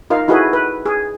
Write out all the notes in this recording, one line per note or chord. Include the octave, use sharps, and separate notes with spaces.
D#4 F4 A#4 F5
D#4 E4 F#4 G#4 A4 B4
B4
G#4